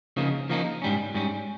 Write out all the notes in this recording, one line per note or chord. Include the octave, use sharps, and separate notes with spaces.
C#3 F3 A#3 D#4
C#3 F3 A#3 D#4
G#2 G3 C#4
G#2 G3 C#4